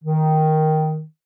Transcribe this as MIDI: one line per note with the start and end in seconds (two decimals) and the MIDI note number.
0.03 1.03 51